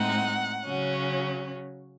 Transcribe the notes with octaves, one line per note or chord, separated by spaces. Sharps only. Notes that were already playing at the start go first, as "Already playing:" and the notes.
Already playing: A2 G#3 C4 D#4 F#5
C#3 F#3 C#4